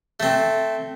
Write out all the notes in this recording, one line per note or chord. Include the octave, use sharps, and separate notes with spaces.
A3 C4